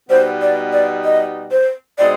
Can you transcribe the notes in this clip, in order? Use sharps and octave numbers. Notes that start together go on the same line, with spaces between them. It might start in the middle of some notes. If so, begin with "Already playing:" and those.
B2 G3 B3 D#4 C5
D5
D5
D#5
C5
B2 G#3 C4 D#4 G#4 D5